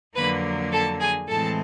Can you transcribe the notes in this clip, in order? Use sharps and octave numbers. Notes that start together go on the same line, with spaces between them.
F2 D3 F#3 A#3 B4 B5
A4 A5
G#4 G#5
A2 E3 G#3 C4 A4 A5